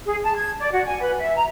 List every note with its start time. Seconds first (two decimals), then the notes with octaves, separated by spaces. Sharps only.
0.06 G#4
0.23 A5
0.36 G#6
0.60 D5
0.72 F#4
0.85 G#5
1.01 B4
1.18 E5
1.36 A#5